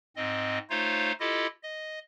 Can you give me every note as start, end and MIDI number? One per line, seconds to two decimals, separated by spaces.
0.16 0.58 44
0.16 0.58 60
0.16 0.58 75
0.70 1.12 57
0.70 1.12 63
0.70 1.12 65
0.70 1.12 72
0.70 1.12 73
0.70 1.12 77
1.20 1.47 64
1.20 1.47 65
1.20 1.47 67
1.20 1.47 69
1.20 1.47 75
1.63 1.99 75